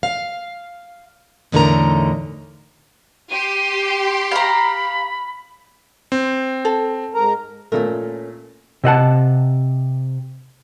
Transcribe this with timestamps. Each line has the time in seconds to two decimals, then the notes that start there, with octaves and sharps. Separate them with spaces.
0.03 F5
1.52 E2 A2 D3 D#4 A#4 A#5
3.31 G4 C6 D#7
4.31 F5 A#5 B5
6.12 C4
6.65 A4
7.15 G#2 A#4 A#5
7.72 A#2 A3 C#4 A4 A#4
8.84 C3 D#5 F#5 A5